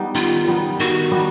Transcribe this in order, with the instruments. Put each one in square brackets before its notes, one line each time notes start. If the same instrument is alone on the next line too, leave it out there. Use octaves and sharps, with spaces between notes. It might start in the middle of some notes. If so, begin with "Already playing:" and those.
Already playing: [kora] G3 B3 D#4
[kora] D#3 [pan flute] F4
[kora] G3 B3 D#4
[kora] D#3 [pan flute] F#4
[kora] G3 B3 D#4